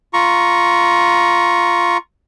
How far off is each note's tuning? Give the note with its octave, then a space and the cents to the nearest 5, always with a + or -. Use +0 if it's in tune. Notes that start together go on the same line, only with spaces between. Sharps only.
F4 +0 A#5 +15 C#6 +0